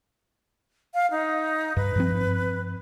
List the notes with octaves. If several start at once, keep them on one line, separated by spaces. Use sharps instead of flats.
F5
D#4
G2 B4
G2 F3 C4